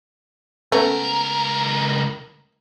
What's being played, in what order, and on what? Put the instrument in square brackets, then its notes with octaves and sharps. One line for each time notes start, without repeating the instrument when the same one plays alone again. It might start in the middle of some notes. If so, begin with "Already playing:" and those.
[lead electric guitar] C#2 A#4 [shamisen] A3 B3 C#4